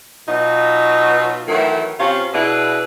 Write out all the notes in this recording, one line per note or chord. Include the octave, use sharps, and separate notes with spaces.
B2 F#3 D#4 F4
D#3 E3 F#3 A3
C3 C#4 F4
B2 D4 E4 G#4 B4